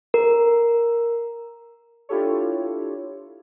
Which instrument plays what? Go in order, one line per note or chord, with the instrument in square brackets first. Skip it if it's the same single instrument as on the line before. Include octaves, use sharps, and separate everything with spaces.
[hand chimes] A#4
[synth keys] D4 E4 F4 G4 A4 C#5